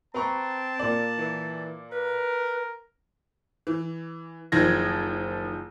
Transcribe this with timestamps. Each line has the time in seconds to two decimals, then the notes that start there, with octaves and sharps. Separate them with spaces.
0.14 C4 B4 A5 A#5 C#6
0.79 A#2 A#3 D5
1.18 E3
1.92 A#4 B4
3.67 E3
4.52 F#1 D#3 F3 G#6 A#6